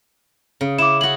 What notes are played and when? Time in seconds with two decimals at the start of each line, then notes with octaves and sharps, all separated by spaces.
0.61 C#3
0.78 E4 D6 E7
1.01 F#4 G#4 F#7